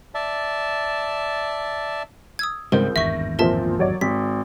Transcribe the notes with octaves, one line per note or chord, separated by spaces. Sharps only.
D5 E5 A5
D#6 E6 G#6
C#2 G#2 C#3 G3 C4 A#4 G6
G#1 E2 G2 E5 C#6 A#6
A#2 F3 C4 A#4 E5 A5
F#3 C#5 D5
G#1 B6